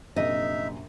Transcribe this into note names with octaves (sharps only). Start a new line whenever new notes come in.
A#1 F#2 C3 D#4 D#5 E5